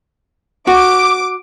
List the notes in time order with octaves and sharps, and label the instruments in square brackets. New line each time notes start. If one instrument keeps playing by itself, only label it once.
[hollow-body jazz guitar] F#4 [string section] D6